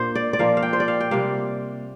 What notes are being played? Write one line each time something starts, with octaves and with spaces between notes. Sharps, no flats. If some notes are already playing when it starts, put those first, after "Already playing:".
Already playing: A#2 A#3 D4 C5
D5
D5
A#2 F3 A#3 F5
F5
G5
C5
D5
F5
G5
C3 G3 A#3 F5